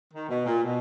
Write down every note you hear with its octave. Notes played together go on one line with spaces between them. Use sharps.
D#3
B2
A#2
B2